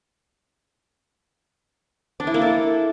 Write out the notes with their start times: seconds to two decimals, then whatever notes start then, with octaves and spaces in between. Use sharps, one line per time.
2.20 D4
2.27 E4
2.34 A#3
2.42 A4